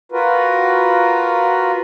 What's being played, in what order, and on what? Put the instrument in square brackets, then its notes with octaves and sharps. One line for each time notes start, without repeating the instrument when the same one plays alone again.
[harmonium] F4 F#4 A#4 B4